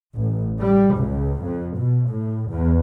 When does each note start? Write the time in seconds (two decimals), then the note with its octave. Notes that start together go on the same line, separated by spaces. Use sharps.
0.17 A1
0.61 G3
0.98 C#2
1.45 F2
1.79 B2
2.11 A2
2.50 E2